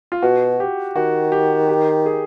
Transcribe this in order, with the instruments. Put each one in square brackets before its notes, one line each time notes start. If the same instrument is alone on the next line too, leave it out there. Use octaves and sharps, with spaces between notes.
[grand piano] F4
[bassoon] B2 [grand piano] F#4
[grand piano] G4
[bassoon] D#3 [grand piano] F#4
[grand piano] G4
G4
G#4